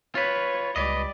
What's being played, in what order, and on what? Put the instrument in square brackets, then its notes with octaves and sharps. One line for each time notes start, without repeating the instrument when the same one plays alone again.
[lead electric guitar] F4 B4 [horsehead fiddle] C#5
[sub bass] C#2 [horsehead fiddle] G3 D5 [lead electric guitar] B4 D#5